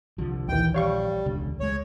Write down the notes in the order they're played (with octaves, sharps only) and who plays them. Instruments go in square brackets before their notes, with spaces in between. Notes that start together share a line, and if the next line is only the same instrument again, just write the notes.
[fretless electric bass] C2 D3 F3
[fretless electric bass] A#1 [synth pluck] D#2 E3 [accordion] G5
[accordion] G3 [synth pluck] C#5 F5 C#6
[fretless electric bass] E1 C#2 D3
[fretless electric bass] C#2 G#3 [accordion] C#5